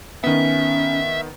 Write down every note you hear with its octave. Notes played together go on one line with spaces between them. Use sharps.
D#3 B3 C#4 E5